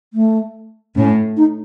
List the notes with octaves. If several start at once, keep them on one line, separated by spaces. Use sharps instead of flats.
A3
A2 C#4
D#4